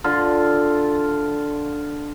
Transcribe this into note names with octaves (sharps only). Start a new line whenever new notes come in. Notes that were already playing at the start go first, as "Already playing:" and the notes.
D3 F4